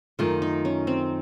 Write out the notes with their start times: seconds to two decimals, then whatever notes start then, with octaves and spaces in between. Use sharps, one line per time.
0.19 F#2 D#3 A3 F4
0.42 D#4
0.65 C#4
0.87 C4